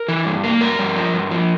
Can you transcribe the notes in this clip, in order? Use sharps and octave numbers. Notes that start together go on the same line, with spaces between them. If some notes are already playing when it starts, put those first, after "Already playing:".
Already playing: A#4
E3
G2
A#3
G2 A#4
G2
F3
G2
F3